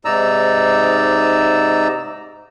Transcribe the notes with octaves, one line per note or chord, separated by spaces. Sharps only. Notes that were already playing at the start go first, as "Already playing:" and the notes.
G#2 C3 D#4 D5 A#5 E6